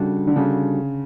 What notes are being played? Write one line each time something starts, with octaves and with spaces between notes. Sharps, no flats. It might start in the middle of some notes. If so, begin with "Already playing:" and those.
Already playing: C#3 G3 D4 F#4 A4
D3
C#3 G3 D4 F#4 A4